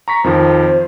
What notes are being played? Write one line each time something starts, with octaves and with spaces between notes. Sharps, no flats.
A#5 C#6 B6
F2 D#3 F3 C5